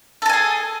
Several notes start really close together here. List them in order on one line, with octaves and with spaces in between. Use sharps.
A4 A5 G#5 G#4